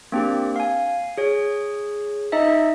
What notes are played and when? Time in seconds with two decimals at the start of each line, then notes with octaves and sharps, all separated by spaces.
0.12 A#3 C4 D4 G4
0.56 F5 G#5
1.18 G#4 C#5
2.32 D#4 D#5 E5